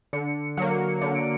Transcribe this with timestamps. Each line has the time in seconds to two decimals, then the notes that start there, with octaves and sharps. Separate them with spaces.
0.13 D3 C#7
0.57 F#3 A#3
1.01 D3 C#7
1.16 D7